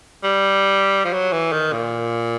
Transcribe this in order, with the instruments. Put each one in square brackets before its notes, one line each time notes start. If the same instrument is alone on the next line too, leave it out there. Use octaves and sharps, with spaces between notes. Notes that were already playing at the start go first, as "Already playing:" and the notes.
[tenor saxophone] G3
F3
F#3
E3
D#3
A#2